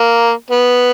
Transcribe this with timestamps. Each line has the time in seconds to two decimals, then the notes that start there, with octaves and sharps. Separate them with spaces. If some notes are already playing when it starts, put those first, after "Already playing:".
Already playing: A#3
0.50 B3